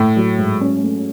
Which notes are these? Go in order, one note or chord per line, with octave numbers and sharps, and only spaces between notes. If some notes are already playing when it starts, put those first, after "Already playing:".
Already playing: A2 A3
F#3
G#2
C#4
A3